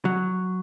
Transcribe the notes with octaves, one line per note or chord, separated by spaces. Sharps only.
F#3